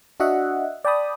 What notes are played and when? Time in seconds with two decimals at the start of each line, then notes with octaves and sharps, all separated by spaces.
0.20 D4 F#4 D#5 E5 F#5
0.85 D5 G5 A5 B5 D#6